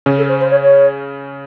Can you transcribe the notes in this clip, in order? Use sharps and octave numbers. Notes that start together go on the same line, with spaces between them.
C#3 C#4
A4
C5
C5
C#5
C#5